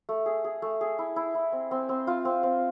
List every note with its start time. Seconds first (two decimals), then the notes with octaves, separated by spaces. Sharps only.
0.09 A3
0.26 G#4
0.44 G#4
0.62 A3
0.81 G#4
0.99 E4
1.16 E4
1.35 E4
1.52 C4
1.71 C4
1.89 C4
2.07 F4
2.25 C4
2.43 C4